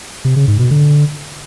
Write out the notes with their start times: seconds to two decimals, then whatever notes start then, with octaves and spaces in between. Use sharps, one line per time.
0.25 C3
0.36 C#3
0.48 G#2
0.59 B2
0.71 D3